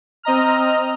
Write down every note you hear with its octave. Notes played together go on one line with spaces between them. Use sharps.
C4 D#5 A#5 F6